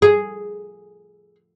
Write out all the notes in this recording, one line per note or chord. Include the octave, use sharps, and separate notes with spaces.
G#4